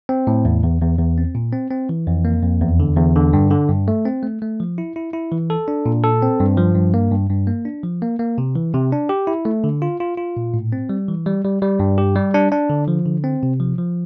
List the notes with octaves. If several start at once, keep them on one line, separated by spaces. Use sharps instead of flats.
C4
A2
E2
E2
E2
E2
C4
A#2
C4
C4
E3
F2
A#3
F2
E2
D3
E2
D3
G2
D3
G2
A3
C4
A3
A3
F3
E4
E4
E4
E3
A4
D4
A#2
A4
C4
G2
F3
G2
A#3
G2
G2
A#3
D4
F3
A#3
A#3
C3
E3
C3
D4
G4
E4
A3
D3
F4
F4
F4
A#2
A2
C4
G3
E3
G3
G3
G3
G2
G4
G3
D4
D4
D3
F3
D3
C4
C3
F3
F3